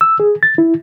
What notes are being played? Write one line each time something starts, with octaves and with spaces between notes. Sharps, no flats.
E6
G#4
A6
E4